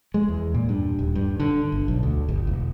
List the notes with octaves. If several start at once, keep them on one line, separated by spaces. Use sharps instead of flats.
G#3
E2
A#2
G2
D#1
G2
D3
G1
B1
D2
G1
E1